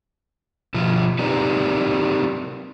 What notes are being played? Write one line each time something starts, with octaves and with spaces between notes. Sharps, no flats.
B2 F3 F4
C4 D#4 G4 A#4 B4 D5